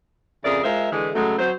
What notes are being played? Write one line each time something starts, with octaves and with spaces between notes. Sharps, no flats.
F2 C#3 G#4 A#4 D5 E5
G#3 F4 A#4 C5 E5
D3 E3 G#3
C#3 F#3 G#3 A3
F#3 C5